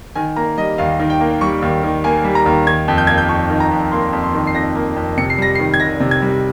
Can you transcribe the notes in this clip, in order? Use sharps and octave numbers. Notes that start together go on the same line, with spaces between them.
D#3 G#5
A#3 A#5
G3 D#5
D#2 F5
D#3
G5
A#3
G3 C#6
D#2
D#3
A#3 G#5
G3
A#5
D#2
D#3 G#6
F2
G6
A#3 G#6
G6
F2 C#6
D#3
A#5
F2
A#3 C6
F2
C6
D#3
C7
F2 A#6
A#3
F2
C3 C#7
C7
G3 A#6
C7
D#3
G#6
C2 A#6
C3
G#6
G3